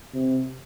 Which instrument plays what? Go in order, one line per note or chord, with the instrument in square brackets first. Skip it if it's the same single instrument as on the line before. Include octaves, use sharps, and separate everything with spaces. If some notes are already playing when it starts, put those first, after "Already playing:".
[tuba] C3